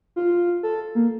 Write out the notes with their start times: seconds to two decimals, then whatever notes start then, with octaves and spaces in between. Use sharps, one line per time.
0.16 F4
0.63 A4
0.95 A#3